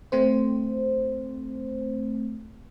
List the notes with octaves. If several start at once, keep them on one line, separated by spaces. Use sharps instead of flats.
A3 C4 C5